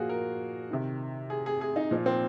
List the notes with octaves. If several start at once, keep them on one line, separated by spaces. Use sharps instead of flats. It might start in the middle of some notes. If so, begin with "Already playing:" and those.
Already playing: A#2 F3 A#3 F4 F#4 G#4
A#4
C3 D#3
G#4
G#4
G#4
D#4
A#2 F3
C4